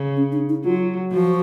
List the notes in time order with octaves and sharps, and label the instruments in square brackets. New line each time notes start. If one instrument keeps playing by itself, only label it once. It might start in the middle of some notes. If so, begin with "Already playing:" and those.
Already playing: [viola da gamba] C#3
[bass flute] C#4
D4
D#4
[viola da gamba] F#3 [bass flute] F4
[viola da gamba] F3 [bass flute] F#4